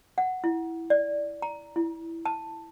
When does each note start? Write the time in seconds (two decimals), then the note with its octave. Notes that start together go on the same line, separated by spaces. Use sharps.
0.18 F#5
0.44 E4
0.90 D5
1.42 A#5
1.76 E4
2.26 A5